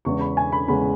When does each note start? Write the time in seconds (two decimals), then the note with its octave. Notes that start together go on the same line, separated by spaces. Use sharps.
0.05 E2 C#3 G#3 C#6
0.21 B5
0.37 G#5
0.52 B5
0.68 E2 C#3 G#3 B5